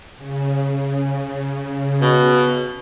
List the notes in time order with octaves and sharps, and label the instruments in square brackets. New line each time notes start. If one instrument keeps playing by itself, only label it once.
[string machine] C#3
[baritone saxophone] B2